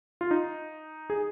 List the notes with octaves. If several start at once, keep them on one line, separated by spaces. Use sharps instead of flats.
F4
D#4
G#4